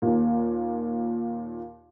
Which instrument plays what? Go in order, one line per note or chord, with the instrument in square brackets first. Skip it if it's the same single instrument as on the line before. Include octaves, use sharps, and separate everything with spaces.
[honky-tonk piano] D#2 A#2